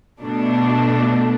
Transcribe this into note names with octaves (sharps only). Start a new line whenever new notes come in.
B2 A3 D4